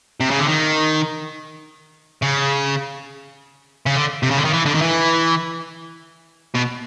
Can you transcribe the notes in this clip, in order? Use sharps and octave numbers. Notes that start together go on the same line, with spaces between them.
C3
C#3
D3
D#3
C#3
C#3
D3
C3
C#3
D3
D#3
E3
D3
D#3
E3
B2